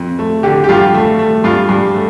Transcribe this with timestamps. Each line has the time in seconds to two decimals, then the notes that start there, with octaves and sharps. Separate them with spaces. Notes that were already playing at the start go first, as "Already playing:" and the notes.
Already playing: F2
0.19 A3
0.43 D3 G4
0.64 G4
0.69 G2 F4
0.94 A3
1.19 A3
1.44 G2 F4
1.69 G2
1.95 A3